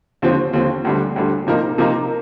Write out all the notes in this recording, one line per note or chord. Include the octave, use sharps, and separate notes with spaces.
D#2 D3 F3 C4
D#2 D3 F3 C4
D2 D3 G3
D2 D3 G3
C3 F3 A#3 D#4 A#4
C3 F3 A#3 D#4 A#4